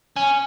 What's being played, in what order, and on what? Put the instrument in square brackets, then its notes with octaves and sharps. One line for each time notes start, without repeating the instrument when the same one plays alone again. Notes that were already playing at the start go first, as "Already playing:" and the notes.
[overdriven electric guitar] C#4